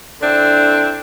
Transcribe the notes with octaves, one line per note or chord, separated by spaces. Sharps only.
D3 C4 D4 E4